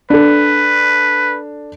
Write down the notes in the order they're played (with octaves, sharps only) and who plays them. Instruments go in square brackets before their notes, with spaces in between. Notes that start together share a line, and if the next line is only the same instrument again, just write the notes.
[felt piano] D4 A4 [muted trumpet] B4